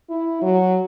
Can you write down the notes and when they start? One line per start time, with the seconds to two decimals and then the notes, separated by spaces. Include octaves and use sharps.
0.10 E4
0.42 F#3